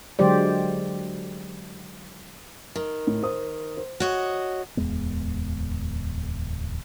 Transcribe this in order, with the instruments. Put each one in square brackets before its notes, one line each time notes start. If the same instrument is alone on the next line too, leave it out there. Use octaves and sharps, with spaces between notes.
[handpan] D3 F#3 G#3 G4 C5 D5
[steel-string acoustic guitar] D#3
[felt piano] A2
C5 D#6
C5
[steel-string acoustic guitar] F#4 C#5 D#5
[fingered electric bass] D1 E2 G#3 B3